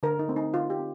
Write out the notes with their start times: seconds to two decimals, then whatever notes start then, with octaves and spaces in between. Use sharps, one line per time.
0.03 D3 A#4
0.19 D#4
0.28 A3 C4
0.36 D#4
0.53 D3 F4
0.70 G4
0.79 C4